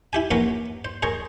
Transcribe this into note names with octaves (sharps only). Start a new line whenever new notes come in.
E4 G4 G#5
A#1 C#4 A#4 B4 F#5 D6
C5
G#4 A#4 C5 C#5